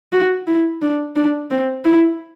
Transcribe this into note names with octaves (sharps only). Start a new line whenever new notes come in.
F#4
E4
D4
D4
C4
E4